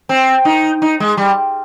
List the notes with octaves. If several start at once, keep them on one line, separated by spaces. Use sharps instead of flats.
C4
D#4
D#4
G#3
G3